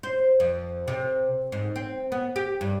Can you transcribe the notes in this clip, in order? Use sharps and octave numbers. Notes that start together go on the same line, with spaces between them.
C5
F2
C3
G#2
C4
B3
G4
G2